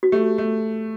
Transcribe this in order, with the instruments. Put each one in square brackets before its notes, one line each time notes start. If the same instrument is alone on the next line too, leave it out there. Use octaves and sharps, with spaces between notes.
[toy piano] F#4
[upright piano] A3 [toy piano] G4
[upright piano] A3